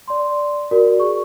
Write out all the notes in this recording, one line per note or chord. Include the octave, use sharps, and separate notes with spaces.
D5 C6
F#4 A#4 D5
G#4 C#6